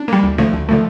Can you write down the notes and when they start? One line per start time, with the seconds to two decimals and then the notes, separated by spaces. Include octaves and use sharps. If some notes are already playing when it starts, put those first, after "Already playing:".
Already playing: D4
0.08 G3 A#3
0.23 D2
0.38 D3 F3 A3
0.53 D2
0.69 D3 F3 A3